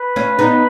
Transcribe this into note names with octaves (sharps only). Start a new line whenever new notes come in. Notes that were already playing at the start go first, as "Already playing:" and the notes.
Already playing: B4
C#4 F4
B3 D#4